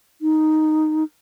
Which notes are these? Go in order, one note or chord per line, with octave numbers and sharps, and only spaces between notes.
D#4